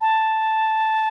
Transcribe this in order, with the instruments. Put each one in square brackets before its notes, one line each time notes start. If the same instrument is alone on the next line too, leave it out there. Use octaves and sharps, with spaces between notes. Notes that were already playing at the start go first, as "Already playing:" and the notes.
[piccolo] A5